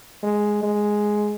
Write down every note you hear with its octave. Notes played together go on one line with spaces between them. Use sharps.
G#3
G#3